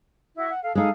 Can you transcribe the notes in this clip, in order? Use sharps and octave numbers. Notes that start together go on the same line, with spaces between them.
E4 F#4
F#5
A4 F5
G#3 D#4 A4 F5 D#6